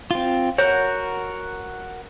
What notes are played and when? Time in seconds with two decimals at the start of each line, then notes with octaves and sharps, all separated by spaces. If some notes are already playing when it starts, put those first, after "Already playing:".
0.11 C4 F4
0.58 F#4 A#4 C#5 F#5